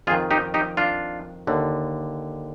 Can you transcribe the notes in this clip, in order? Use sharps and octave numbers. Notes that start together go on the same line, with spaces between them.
F2 D#3 F4 G#4
D#4 G4
D#4 G4
D4 F4
D#2 D3